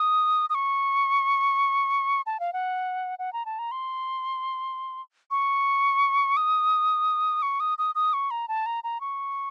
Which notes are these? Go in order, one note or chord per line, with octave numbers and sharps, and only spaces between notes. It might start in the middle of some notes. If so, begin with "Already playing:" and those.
Already playing: D#6
D#6
C#6
A5
F5
F#5
F#5
A#5
A5
A#5
C6
C#6
D#6
C#6
D#6
D#6
D#6
C#6
A#5
A5
A#5
A#5
C#6